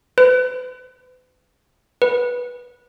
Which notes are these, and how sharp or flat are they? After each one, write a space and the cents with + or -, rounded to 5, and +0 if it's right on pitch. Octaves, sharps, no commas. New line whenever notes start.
B4 +40
B4 -10